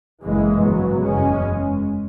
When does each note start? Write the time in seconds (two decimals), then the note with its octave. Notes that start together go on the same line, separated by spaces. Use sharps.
0.23 F#1 F#2 C#3 E3 G#3
0.62 G#1 F#2 C#3 F#3 B3
1.02 F#1 E2 C#3 G#3 C#4